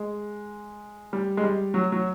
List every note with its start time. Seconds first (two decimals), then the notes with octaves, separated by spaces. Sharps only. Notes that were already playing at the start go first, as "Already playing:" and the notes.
Already playing: G#3
1.13 G3
1.37 G#3
1.43 G3
1.74 F#3
1.92 F#3